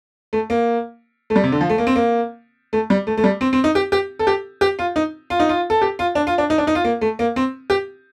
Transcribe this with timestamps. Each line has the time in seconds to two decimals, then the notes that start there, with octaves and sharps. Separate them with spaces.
0.33 A3
0.50 A#3
1.30 A3
1.36 G3
1.44 C3
1.52 D3
1.61 F3
1.70 A3
1.78 A#3
1.87 C4
1.96 A#3
2.73 A3
2.90 G3
3.07 A3
3.17 A3
3.24 G3
3.41 C4
3.53 C4
3.64 D#4
3.75 G4
3.92 G4
4.19 A4
4.27 G4
4.61 G4
4.79 F4
4.96 D#4
5.30 F4
5.40 D#4
5.49 F4
5.70 A4
5.82 G4
5.99 F4
6.15 D4
6.27 F4
6.38 D4
6.50 D#4
6.58 D4
6.67 D#4
6.75 F4
6.84 A#3
7.01 A3
7.19 A#3
7.36 C4
7.70 G4